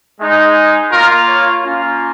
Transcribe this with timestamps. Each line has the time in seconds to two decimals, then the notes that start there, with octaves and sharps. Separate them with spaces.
0.19 G#3 D#4
0.92 A#3 F4 A#4
1.28 C#5
1.63 A#3 C#4 F4